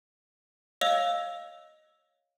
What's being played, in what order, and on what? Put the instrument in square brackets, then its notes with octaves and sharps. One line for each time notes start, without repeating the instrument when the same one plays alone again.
[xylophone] C#5 D#5 F5 E6 F7